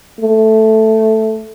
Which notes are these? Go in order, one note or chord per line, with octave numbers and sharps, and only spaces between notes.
A3